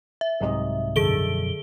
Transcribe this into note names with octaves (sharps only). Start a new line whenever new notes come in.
E5
C2 G#2 C3 F#3 D#5
F#2 B2 D3 F3 G#4 A4 D7 G7